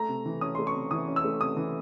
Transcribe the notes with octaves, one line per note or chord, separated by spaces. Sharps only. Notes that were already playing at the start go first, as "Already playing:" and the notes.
Already playing: A3 A#5
C3
E3
C#4 D#6
A3 C6
C#6
C3
E3 D#6
C#4
E6
A3
C3 D#6
E3